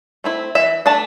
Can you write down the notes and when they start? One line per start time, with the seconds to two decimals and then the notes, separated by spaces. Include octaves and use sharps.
0.24 A3 C4 E4
0.55 E3 E5
0.86 A3 D4 A5